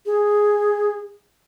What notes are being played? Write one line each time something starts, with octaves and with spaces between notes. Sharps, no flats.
G#4